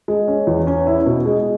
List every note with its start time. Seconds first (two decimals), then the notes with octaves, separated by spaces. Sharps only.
0.08 G#3
0.28 C#4
0.47 E2
0.67 C#4
0.87 E4
1.06 B2
1.26 G#3